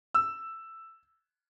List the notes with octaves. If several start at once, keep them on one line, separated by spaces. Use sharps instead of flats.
E6